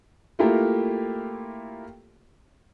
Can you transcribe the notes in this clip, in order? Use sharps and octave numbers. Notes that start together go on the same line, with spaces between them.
A3 A#3 E4 F4 G4 A#4